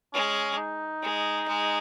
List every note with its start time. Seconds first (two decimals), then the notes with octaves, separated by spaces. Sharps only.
0.14 G#3 C#4
0.58 D#4
1.02 G#3
1.48 G#3